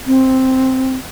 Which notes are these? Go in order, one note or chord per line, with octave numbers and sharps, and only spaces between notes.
C4